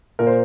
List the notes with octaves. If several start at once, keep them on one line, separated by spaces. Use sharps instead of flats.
A#2 A#4
C5